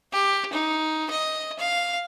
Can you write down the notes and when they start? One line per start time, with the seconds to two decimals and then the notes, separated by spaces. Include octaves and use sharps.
0.12 G4
0.53 D#4
1.10 D#5
1.59 F5